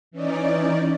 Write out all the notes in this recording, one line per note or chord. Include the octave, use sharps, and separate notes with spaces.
E3 C#4 D#4 D5